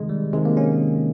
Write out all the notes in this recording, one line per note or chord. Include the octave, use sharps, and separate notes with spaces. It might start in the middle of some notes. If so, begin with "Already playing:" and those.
Already playing: C3 D#3 G#3
G3
C3 D#3 G#3
A#3
C#4